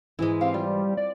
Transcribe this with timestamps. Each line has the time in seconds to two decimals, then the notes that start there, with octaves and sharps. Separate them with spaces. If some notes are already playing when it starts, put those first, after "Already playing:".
0.19 G#2 E3 G#3 E4
0.41 C4 G4 F5
0.54 G3 F4
0.97 D5